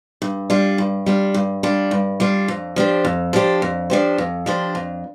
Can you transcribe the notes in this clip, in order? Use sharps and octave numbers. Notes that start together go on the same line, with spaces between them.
G2
G3 D4 F4
G2
G3 D4 F4
G2
G3 D4 F4
G2
G3 D4 F4
F2
F3 D4 G4 C5
F2
F3 D4 G4 C5
F2
F3 D4 G4 C5
F2
F3 D4 G4 C5
F2